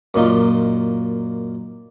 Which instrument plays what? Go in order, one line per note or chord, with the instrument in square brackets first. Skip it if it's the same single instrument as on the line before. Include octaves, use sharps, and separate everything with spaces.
[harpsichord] F#2 A#2 D#4 F4